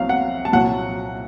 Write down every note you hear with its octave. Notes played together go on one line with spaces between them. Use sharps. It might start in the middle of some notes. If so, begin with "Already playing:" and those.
Already playing: C2 C3 F#3 F5
F#5
A5
C2 A#2 F#3 F#5